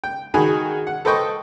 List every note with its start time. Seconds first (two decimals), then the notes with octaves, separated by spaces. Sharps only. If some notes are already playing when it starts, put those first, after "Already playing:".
0.04 G5
0.34 D#3 F#4 G#4 G#5 B5
0.87 F#5
1.05 A4 B4 C5 D#5 G5 C#6